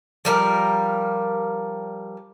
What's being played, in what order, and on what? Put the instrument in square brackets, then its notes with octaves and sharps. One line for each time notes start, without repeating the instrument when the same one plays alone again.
[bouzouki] F3 G3 A#4